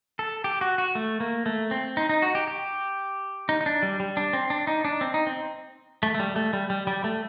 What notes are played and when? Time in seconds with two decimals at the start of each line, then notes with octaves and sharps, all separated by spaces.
0.19 A4
0.44 G4
0.61 F#4
0.78 F#4
0.95 A3
1.20 A#3
1.46 A3
1.71 C4
1.97 D#4
2.09 D#4
2.22 F#4
2.35 G4
2.48 G4
3.49 D#4
3.61 D#4
3.66 D4
3.83 G3
4.00 G3
4.17 D4
4.33 C4
4.50 D4
4.67 D#4
4.85 D4
5.01 C4
5.14 D#4
5.27 C4
6.03 A3
6.15 A3
6.20 G3
6.36 A3
6.53 G3
6.70 G3
6.87 G3
7.04 A3